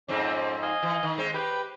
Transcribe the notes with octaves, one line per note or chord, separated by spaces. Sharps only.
F2 G#2 C4 C#4 D5
D#5 F5 G#5
E3
D#3
G#3 C4
G4 B4 G5